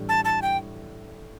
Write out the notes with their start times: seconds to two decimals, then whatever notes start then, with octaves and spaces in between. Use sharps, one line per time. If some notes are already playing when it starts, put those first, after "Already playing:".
Already playing: A2 E3 G3 D4
0.09 A5
0.25 A5
0.42 G5